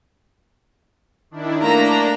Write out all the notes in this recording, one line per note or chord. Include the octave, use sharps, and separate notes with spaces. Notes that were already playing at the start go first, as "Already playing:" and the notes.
D#3 D4 E4
A3 A#3 D4 A#5